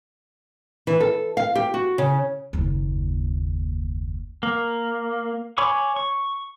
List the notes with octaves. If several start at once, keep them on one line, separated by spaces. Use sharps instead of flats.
E3
A4
F5
G4
F#4
C#3
F#1 D#2
A#3
C#5 G#5 B5 C#6 D6
C#6